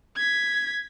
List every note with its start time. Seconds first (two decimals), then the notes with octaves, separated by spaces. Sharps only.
0.15 G#6 B6